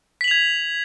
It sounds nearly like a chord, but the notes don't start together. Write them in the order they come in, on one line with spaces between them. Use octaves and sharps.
B6 F#7 F7 G#6